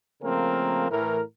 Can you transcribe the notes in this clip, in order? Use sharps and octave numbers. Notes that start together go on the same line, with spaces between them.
C#3 F3 A3 A#3 C4 A#4
A2 E3 A#4